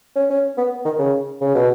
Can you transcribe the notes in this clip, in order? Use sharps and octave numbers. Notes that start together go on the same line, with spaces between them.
C#4
C#4
B3
D#3
C#3
C#3
B2